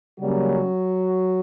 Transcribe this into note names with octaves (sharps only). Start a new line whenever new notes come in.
C#3 F#3 G3 A#3 C#4 F#4